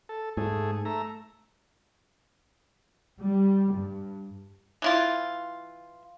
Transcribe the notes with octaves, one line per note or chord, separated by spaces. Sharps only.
A4
G#2 A3 G#4
A3 E5 A#5
G3
G2
E3 E4 F4